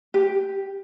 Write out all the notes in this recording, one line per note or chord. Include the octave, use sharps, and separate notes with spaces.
G4